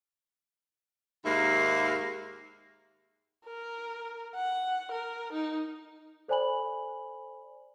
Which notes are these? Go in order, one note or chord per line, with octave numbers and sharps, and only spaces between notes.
D#2 G#2 A#3 E5
A#4
F#5
A#4
D#4
A4 C5 D5 G#5 B5 F#7